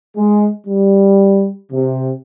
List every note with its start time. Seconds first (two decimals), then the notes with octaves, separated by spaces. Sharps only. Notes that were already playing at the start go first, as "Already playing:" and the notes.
0.16 G#3
0.67 G3
1.72 C3